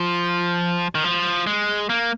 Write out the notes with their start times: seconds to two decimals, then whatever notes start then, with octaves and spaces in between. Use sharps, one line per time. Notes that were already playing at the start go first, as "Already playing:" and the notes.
Already playing: F3
0.95 D#3
1.04 F3
1.47 G#3
1.89 A#3